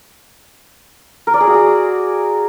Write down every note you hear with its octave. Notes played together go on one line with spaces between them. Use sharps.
A#4
D5
G#4
F#4
G#4